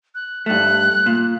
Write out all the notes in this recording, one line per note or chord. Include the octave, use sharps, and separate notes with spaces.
F#6
G2 A3 F#6
A#2